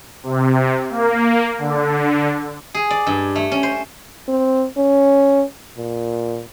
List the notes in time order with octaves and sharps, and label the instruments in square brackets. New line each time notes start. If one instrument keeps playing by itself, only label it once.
[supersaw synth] C3
A#3
D3
[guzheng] G#4
D5
G2
A3
C#4
C5
[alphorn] C4
C#4
A#2